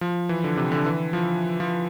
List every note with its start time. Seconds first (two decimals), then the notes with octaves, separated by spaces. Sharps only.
0.01 F3
0.29 E3
0.44 D3
0.57 C3
0.72 D3
0.86 E3
1.13 F3
1.60 F3